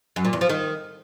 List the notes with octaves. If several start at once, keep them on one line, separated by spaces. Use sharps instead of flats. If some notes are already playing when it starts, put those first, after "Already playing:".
F#2
A#2
E2
F3
D#3